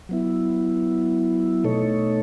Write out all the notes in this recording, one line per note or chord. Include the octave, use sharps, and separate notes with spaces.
F#3 B3 E4
B2 A3 D#4 A4 C#5